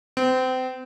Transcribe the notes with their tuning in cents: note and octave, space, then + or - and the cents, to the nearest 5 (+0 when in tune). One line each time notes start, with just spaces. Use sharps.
C4 -30